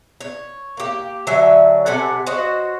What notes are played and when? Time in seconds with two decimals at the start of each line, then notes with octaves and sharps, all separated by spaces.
0.20 C#5
0.77 A#3 G4
1.27 D3 F#3 E5 G#5
1.86 C3 A4 F#5 G#5
2.27 F#4 C5 C#5 D#5